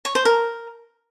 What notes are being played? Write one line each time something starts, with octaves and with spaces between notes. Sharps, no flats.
C#5
C5
A#4